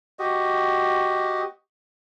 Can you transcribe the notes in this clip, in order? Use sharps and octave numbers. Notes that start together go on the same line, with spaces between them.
F#4 G4 D#5